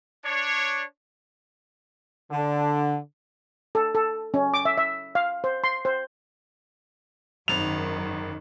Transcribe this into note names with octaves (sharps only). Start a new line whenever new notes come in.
D4 C#5
D3
A4
A4
C#4
D6
E5
E5
F5
C5
C6
C5
G#1 F#2 D#3 F7